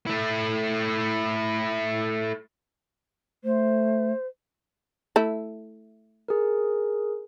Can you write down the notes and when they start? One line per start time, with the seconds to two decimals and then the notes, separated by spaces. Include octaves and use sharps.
0.06 A3 E4
3.44 A3 C5
5.16 A3 E4
6.28 G#4 A#4